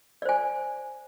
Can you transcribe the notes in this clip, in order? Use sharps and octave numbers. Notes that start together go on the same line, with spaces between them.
C5 D5 G#5